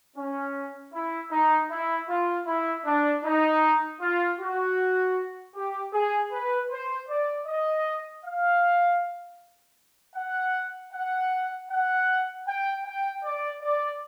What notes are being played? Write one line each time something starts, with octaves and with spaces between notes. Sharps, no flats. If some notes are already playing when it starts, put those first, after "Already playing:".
C#4
E4
D#4
E4
F4
E4
D4
D#4
F4
F#4
G4
G#4
B4
C5
D5
D#5
F5
F#5
F#5
F#5
G5
G5
D5
D5